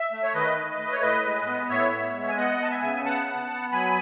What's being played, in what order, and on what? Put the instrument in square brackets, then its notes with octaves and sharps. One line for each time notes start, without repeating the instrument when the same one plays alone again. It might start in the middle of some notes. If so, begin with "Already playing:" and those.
Already playing: [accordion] E5
A3
C#5
D#3 B4 D#5
A3
A3
C#5
A2 B4 D#5
G#3
B3
A2 C#5 E5
B3
G#3
G#5
B3 D#5 F#5
B3 A5
E5 G#5
C#3
B3 F#5 A5
B3
B3
F#3 G#5 B5